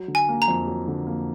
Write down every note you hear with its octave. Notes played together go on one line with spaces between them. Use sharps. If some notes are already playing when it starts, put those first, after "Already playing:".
Already playing: F#3
D3
G#5
A#3
A#5
F2
F#3
D3
A#3